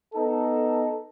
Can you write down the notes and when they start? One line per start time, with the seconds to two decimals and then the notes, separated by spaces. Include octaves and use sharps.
0.14 B3 D#4 A4